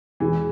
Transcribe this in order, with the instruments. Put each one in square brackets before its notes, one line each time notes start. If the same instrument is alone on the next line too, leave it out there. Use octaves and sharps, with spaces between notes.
[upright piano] E2 B2 G#3 B3 [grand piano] E3